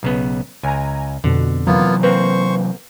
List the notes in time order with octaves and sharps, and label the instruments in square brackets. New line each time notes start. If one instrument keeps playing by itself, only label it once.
[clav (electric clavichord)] B1 C#3 B3
[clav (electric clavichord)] C#2 [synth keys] G#5 A#5
[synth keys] F2 B2 [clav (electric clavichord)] D3
[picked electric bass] C3 E3 F#3 [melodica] A#3 B3 F4
[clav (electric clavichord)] A#3 C4 [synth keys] B4 [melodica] C5 C#6